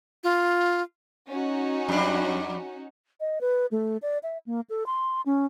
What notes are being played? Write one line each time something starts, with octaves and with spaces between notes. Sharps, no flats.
F4
C#4 D#4 F#4
F2 G3 D4
D#5
B4
A3
D5
E5
A#3
A4
C6
C#4